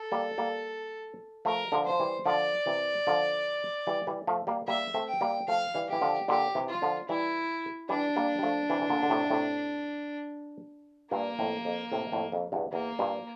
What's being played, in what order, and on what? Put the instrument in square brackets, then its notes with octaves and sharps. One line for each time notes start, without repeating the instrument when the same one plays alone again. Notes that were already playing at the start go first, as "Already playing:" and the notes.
Already playing: [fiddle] A4
[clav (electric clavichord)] G3 A#3
G3 A#3
[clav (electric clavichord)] F3 A3 [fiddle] A#4
[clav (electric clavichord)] D3 F3
[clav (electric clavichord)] F3 [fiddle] C5
[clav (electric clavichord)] E3 G3
[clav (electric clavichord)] D3 F3 [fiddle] D5
[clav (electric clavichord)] C3 E3
D3 F3
E3 G3
E3 G3
F3 A3
G3 A#3
[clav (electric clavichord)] G3 A#3 [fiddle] E5
[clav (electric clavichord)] A3 C4
[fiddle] G5
[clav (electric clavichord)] G3 A#3
[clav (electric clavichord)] F3 A3 [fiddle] F5
[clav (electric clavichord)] E3 G3
[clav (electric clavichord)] E3 [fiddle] G4
[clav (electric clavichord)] D3 F3
[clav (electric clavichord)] A#2 D3 [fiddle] G4
[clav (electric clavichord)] C3 E3
[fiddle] F4
[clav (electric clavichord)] D3 F3
[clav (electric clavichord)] E3 G3 [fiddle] E4
[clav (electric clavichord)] E3 G3 [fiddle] D4
[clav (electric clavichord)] G3 A#3
G3
F3 A3
C3 E3
E3
A#2 D3
D3
A2 C3
A2 C3
[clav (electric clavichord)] G2 A#2 [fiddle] A#3
[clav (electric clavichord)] F2 A2
F2
A2 C3
F2 A2
F2
E2 G2
[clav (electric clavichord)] E2 [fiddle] A#3
[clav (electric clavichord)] G2 A#2